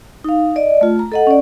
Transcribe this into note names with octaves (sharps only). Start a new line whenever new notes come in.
D#4 F5
D5 D#5
A3 F4
A#5
A4 D#5 F#5
C#4 D5